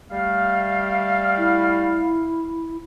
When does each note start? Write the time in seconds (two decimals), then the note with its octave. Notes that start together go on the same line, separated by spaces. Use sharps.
0.11 G3 A3 F5
1.38 E4